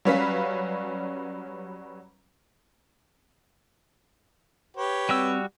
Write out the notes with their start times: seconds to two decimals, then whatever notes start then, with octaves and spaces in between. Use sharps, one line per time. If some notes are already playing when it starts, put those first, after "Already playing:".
0.05 F#3 G3 C#4 B4 F5 B6
4.77 G4 B4 C#5
5.09 G3 C4 F#4 E6